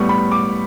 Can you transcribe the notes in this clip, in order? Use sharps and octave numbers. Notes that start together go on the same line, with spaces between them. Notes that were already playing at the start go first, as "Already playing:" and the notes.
Already playing: A2 G3 B3 C#6
B5
D6